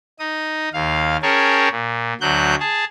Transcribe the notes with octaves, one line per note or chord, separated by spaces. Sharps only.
D#4 D#6
D#2 F5
C#4 G#4 A#4 C#5 G5 A5
A#2
D2 F#3 F#6 G6
G#4 A5